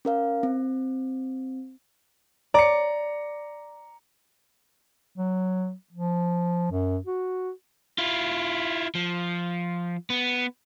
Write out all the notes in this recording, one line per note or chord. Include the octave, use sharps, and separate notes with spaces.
C#4 A#4 F5
C4
D5 A#5 C#7
F#3
F3
F#2
F#4
E4 F4
F3
B3